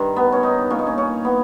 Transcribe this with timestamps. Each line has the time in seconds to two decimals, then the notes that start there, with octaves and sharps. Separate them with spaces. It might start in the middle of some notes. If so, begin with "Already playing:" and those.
Already playing: G2 D#3
0.16 B3
0.32 C#4
0.43 D#4
0.70 A#2 C#4
0.79 D#4
0.87 C#4
0.98 C#4
1.25 B3